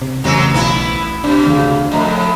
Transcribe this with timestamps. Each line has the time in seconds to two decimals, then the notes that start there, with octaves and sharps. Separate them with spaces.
0.02 C3
0.24 A1 F#2 C#3 F#3 C4
0.54 B1 B3 E4
1.24 B2 D4
1.46 D2 C#3
1.92 F2 A3 D#5 A#5 B5